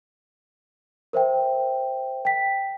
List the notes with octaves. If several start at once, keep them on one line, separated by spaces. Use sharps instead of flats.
A#4 C5 E5 G5
G5 B6